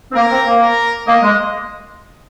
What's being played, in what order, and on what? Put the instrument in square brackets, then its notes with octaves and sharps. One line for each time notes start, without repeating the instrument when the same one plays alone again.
[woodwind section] C4
[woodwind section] A#3 [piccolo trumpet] A#4
[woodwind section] C4
A#3
[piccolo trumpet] A#4
[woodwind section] A#3 [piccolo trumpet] D#5
[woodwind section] G#3